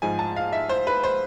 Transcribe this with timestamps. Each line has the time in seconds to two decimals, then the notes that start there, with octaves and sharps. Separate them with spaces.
0.02 G#2 F3 G#5
0.19 A5
0.36 F5
0.53 E5
0.69 C5
0.87 B4
1.03 C5